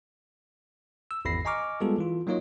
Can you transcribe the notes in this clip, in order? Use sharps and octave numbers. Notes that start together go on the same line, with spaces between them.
E6
G#1 E2 B5 A#6 C7
D#5 G#5 A#5 C#6 D6 F6
G3 G#3 B3 F4 G#4 A4
E3 F4
F#3 A#3 D#4 F4 C#5 D#5